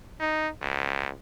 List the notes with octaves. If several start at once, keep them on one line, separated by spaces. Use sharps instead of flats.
D#4
C#2